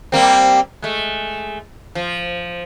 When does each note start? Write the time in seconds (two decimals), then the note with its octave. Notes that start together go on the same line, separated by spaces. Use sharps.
0.12 G3 A#3 C4
0.82 G#3 A3
1.95 F3